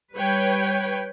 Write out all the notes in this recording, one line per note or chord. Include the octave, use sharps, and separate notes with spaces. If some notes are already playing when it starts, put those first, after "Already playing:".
G3 B4 C#5 G5